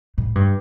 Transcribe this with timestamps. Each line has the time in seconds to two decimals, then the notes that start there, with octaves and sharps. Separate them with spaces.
0.18 A2
0.35 G2